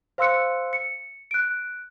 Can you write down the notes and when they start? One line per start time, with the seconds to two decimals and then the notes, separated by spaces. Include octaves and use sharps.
0.18 C5 F5 C6 E6 F#6 C#7
0.73 C#7
1.31 F#6 D7